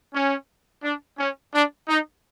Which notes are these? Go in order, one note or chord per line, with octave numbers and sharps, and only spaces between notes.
C#4
D4
C#4
D4
D#4